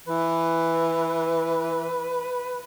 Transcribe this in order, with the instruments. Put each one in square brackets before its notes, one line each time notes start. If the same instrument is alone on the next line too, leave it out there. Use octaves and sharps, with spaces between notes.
[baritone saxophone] E3 [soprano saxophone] B4